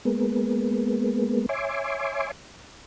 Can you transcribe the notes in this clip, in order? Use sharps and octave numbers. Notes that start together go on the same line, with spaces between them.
G#3 A#3 B3
C#5 E5 G#5 C6 D6